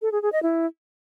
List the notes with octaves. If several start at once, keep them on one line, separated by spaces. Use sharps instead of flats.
A4
G#4
G#4
D#5
E4